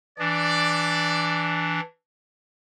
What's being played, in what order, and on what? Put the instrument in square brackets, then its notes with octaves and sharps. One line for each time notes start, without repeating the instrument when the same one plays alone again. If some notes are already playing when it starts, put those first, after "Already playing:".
[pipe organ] E3 D4 [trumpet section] D5